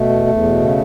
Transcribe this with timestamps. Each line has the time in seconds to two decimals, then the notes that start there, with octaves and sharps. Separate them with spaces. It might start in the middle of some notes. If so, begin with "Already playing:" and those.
Already playing: B2 A3
0.10 E2
0.27 E2
0.43 B2
0.60 C#3